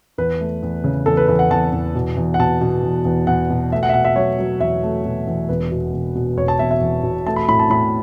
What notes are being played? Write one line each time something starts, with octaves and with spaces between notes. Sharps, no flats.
E2 B4
A3
E2
C#3
E2 A4
B4
E2 B4
F#5
E2 A5
E2
B2
E2
F#5
B2 A5
B2
E2
E2
E2 F#5
B2
A3 E5
F#5
E5
B2 F#5
E5
F#3 C#5
F#3
E2 E5
A3
B2
E2
E1 B4
B2
E1
B2
E1 C#5
A5
E1 E5
E5
E2
B2
A3 A5
B5
A2 B5
A5
A2 B5